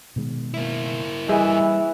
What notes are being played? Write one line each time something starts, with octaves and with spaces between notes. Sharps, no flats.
B2 D#3 G#3
A#3 E4
E3 G3 G#4 D#5 E5